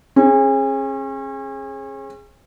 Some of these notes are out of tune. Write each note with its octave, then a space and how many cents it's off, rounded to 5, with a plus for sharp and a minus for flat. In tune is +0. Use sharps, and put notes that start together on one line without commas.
C#4 -40 G#4 +0